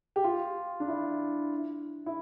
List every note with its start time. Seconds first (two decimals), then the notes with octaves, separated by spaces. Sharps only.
0.16 G4
0.24 F4
0.80 D4
0.88 E4
2.06 E4